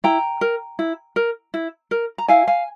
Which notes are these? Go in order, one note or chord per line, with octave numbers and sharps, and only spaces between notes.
E4 G5 A#5
A#4
E4
A#4
E4
A#4
A#5
E4 F5 G#5
F5 G#5